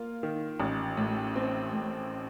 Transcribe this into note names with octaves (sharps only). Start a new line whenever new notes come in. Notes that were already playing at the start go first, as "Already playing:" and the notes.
Already playing: A#3 F4
D#3
A1
A2
C4
A2